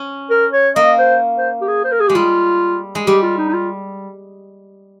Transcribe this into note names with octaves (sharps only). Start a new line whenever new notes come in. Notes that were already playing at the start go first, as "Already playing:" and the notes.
Already playing: C#4
A#4
C#5
A#3 D#5
C5
C5
G4
G#4
C5
A#4
G#4
G#3 G4
G3 F4
G#3
G3 G4
F4
D#4
D#4
F4